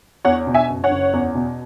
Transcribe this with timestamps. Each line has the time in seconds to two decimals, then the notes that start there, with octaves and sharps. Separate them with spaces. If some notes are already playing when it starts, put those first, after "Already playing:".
0.25 E2 C#5 F#5
0.47 B2
0.54 E5 G#5
0.69 F#1
0.84 C#5 F#5
0.91 F#1
1.13 E2
1.35 B2